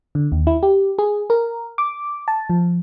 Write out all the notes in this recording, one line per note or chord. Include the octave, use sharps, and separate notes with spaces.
D3
D#2
E4
G4
G#4
A#4
D6
A5
F3